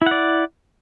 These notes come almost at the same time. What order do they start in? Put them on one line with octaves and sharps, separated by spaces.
E4 F#5 D5